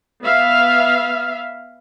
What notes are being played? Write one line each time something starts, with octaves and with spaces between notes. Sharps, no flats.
B3 E5 F5